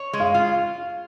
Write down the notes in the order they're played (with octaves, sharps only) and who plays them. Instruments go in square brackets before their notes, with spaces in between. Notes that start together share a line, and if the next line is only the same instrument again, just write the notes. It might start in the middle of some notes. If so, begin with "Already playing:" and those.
Already playing: [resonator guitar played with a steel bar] C#5
G#3
[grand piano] F5
[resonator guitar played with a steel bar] F4